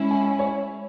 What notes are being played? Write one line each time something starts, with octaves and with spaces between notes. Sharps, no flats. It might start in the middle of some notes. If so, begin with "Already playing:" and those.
Already playing: G#3 C#4 E4
G#5
G#5
C#5